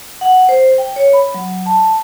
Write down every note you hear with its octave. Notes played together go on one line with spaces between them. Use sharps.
F#5
C5
G5
C#5
B5
F#3
A5